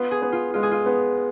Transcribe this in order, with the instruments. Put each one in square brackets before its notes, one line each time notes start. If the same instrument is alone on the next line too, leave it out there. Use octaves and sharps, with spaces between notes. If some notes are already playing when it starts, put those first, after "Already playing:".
Already playing: [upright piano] B3 [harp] F4
[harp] G#4
[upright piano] B3
[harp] F4
[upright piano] G#3 [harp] F4
[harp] G#4
F4
[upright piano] B3